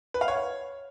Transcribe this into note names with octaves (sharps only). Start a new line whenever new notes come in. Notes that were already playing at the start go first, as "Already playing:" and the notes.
B4
F5
C#5